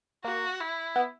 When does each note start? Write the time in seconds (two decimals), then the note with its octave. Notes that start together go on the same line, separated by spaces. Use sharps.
0.24 A#3 F#4
0.61 E4
0.96 B3